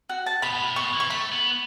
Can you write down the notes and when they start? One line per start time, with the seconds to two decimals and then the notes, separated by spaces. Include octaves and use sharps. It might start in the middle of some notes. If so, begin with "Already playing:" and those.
0.09 F#4
0.26 A5
0.42 B2 B5
0.52 B2
0.60 A2
0.76 B2 C#6
0.94 E3
1.00 C#6
1.10 A3 B5
1.32 B3